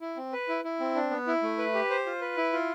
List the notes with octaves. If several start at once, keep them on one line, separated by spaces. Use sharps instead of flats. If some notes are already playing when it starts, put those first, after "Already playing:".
E4
C4
B4
E4
E4
C4
D4
B3
E4
A3
B4
G4
C5
F4
B4
E4
F4